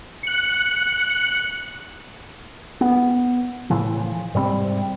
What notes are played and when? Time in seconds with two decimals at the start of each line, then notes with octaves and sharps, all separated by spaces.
0.23 F#6 C#7
2.81 B3
3.70 A2 C#3 E3 F3
4.35 G#2 C3 G3 C4